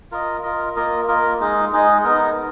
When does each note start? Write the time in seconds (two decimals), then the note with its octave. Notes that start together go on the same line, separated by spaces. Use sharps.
0.12 F4 A#4 D#5
0.43 F4 A#4 D#5
0.76 A#3 F4 A#4 D#5
1.08 A#3 F4 A#4 D#5
1.40 G#3 D#4 G#4 D#5
1.72 G#3 D#4 G#4 D#5
2.04 B3 D#4 A#4 D#5